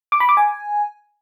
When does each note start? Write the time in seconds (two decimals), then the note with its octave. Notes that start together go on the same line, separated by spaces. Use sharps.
0.12 D6
0.20 B5
0.29 D6
0.37 G#5